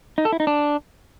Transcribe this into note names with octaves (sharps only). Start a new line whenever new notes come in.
D#4
A4
E4
D#4
D4